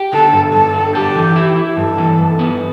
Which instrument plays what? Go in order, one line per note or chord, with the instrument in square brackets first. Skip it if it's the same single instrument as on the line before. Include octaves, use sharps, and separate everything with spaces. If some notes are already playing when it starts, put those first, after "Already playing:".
Already playing: [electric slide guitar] G4
[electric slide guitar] D3 [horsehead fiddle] A4
[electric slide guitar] G2
[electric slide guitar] G2 [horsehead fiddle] A4
[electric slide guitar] D3
[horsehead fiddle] G4 [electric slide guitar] A4
[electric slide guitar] E3
E4
E4
[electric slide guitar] G2 [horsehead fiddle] A4
[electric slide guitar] E3
G2
B3